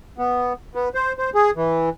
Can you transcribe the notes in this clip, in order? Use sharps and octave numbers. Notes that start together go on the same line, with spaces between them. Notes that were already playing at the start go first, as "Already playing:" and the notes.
B3
B3
C5
C5
G#4
E3